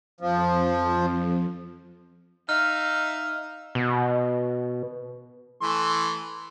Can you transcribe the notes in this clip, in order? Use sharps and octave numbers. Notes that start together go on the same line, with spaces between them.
F2 F3
D#4 E5 F5 F6
B2
E3 A3 C6